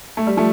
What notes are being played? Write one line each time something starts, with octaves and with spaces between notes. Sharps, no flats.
A3
G3
F3 A3